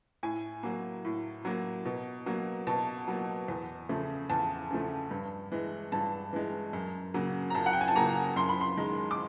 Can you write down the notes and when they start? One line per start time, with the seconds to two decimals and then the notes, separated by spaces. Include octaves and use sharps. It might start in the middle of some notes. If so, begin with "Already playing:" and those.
0.23 A2 G#5
0.63 F#3 A#3
1.05 A2
1.45 F#3 A#3
1.85 B2
2.26 F#3 A#3
2.67 B2 A5
3.08 F#3 A#3
3.48 E2
3.89 C#3 F3 A3
4.30 E2 A5
4.71 C#3 F3 A3
5.11 G2
5.52 E3 G#3
5.92 G2 A5
6.33 E3 G#3
6.73 F#2
7.14 C#3 F#3 A#3
7.50 A#5
7.55 F#2 A5
7.66 F#5
7.73 G5
7.81 G#5
7.88 A5
7.95 C#3 F#3 A#3 A#5
8.36 F#2 C6
8.49 B5
8.61 C6
8.77 D#3 G#3
9.11 D6